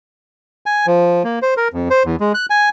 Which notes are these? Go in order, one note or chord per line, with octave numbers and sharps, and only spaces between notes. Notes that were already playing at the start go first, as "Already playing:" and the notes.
G#5
F3
A#3
C5
A#4
F2
C5
E2
G#3
F#6
G#5